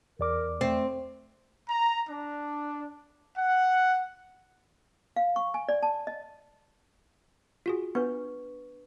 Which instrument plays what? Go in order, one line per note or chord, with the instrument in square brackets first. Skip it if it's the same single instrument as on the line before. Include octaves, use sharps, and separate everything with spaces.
[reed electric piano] E2 D5 D6 [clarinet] A#4
[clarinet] A3 [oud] C4
[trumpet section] A#5
D4
F#5
[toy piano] F5
C#6
G#5
D5
A5
D#5
[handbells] F4 F#4 G#4
[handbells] B3 [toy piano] D4 B4 C#6